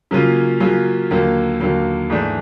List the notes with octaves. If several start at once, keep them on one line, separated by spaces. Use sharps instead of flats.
C#3 F#3 A#3 C#4 F4
C#3 F#3 A#3 C#4 F4
D#2 D3 F#3 A#3
D#2 D3 F#3 A#3
G#2 E3 A3 D4